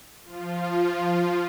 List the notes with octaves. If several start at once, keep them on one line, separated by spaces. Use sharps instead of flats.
F3 F4